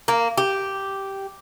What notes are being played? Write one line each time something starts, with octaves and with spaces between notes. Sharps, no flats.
A#3
G4